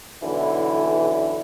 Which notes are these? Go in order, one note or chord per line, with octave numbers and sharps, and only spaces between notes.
B1 D3 E3 E4